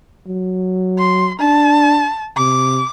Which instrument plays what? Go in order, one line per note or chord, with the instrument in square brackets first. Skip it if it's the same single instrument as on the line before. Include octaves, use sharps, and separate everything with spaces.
[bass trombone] F#3
[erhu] C6
[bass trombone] D4 [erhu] A5
[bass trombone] C3 [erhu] D6